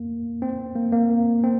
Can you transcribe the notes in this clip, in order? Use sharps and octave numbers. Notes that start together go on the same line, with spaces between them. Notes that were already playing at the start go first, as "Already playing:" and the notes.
Already playing: A#3
C4
A#3
A#3
C4